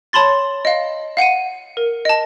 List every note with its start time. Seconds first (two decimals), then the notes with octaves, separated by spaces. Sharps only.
0.13 C#5 A5 B5 C6 A6
0.65 D#5 F5
1.17 F5 F#5 C#7 D#7
1.77 A#4
2.05 D#5 A5